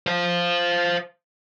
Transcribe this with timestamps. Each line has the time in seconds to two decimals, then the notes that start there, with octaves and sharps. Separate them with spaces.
0.07 C5 F5